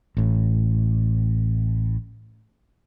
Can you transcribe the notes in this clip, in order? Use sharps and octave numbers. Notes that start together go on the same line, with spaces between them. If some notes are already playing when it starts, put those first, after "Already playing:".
A1 A2